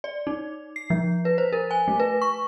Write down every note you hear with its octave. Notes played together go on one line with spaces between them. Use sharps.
D5
D#4
C7
F3
B4
C5
A#4
G#5
A3
B4
C#6